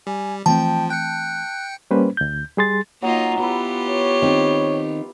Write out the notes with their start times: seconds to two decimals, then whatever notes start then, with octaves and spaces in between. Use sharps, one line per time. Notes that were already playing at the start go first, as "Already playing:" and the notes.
0.07 G3 G#5
0.46 E3 F3 A3 C4 G5 A5
0.90 G5 F#6 C#7
1.91 G3 A#3 C#4 B4 C5
2.17 D2 G6
2.58 G3 G#4 C6 A6
3.02 F#3 A#3 D#4 F4
3.39 B3 E4 F4 G4 B4
3.88 C#5
4.22 D#3 C4